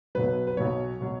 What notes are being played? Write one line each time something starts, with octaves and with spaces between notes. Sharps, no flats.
B1 B2 F#3 B4
B4
B1 B2 F#3 C#5
B2 F#3